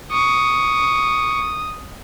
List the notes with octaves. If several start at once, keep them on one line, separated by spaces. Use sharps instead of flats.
C#6 D#6